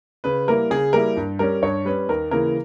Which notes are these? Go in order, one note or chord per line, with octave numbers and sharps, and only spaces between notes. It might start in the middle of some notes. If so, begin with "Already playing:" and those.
C#3 B4
G3 A#3 E4 A#4
C#3 G#4
G3 A#3 E4 A#4
G2
G3 C#4 A#4
G2 C#5
G3 C#4 B4
D#2 A#4
C#3 E3 A#3 A#4